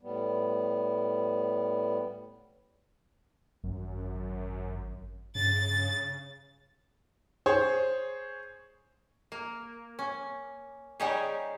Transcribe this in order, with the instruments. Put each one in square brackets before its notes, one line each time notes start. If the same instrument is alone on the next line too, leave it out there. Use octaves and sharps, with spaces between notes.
[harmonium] A2 G3 B3
[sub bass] G#1 [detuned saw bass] F#2
[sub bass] G2 [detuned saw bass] C#3 [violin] A6
[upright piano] G#4 C5 C#5
[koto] A#3
C#4
C#3 G3 C#4 D#4 G4 G#4